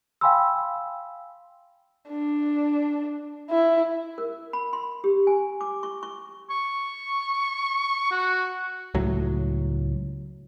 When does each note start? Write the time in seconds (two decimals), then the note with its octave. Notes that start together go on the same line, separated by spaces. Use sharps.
0.21 F5 G5 G#5 B5 C6 E6
2.10 D4
3.50 E4
4.18 A#4
4.53 B5
4.73 C6
5.04 G4
5.27 G#5
5.61 D6
5.83 C#6
6.03 C#6
6.50 C#6
8.11 F#4
8.94 C#2 A2 F#3